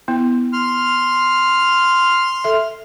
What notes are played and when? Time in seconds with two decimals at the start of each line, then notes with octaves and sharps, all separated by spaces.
0.08 B3 E4
0.53 C6 F6
2.44 A4 E5